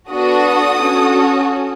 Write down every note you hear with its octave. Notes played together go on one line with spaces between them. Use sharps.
B3 D4 F#4 A4 D#6
C#4 F#4 A4